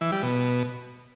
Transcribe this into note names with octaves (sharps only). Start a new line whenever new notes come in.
E3
G3
B2